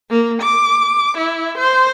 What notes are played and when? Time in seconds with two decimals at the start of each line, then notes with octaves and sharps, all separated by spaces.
0.10 A#3
0.42 D6
1.17 E4
1.58 C5